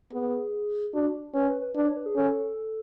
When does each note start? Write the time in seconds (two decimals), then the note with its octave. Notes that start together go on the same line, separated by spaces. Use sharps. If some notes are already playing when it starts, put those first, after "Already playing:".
0.12 B3 G#4
0.94 D4 F#4
1.34 C#4 B4
1.49 B4
1.62 B4
1.75 D4 B4
1.85 C#5
1.96 B4
2.06 G#4
2.16 C#4 A4